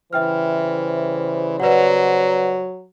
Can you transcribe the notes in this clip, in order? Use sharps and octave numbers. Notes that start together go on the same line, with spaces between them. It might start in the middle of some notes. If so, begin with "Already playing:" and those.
C#3 E3 G3 C5 E5 G5 F6
F#3 B4 D5 F#5